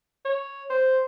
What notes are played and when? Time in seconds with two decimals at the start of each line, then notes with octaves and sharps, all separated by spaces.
0.25 C#5
0.70 C5